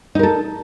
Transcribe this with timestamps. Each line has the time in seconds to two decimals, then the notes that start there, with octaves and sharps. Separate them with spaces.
0.15 D#4
0.19 A#4
0.23 A4